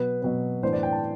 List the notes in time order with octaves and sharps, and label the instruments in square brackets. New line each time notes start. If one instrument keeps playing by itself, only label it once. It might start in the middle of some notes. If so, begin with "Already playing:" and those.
Already playing: [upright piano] B2 F#3 B3 B4
B2 F#3 B3
A2 E3 B3 D4 C5
D5
G5
A5